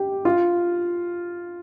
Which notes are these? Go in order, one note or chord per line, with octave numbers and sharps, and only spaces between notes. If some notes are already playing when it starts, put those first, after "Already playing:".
Already playing: G4
F4